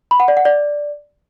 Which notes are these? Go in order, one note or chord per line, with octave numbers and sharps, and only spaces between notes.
B5
F#5
D5
F#5
D5